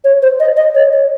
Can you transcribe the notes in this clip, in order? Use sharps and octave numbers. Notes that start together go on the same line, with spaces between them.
C#5
C5
D#5
D#5
C#5
C#5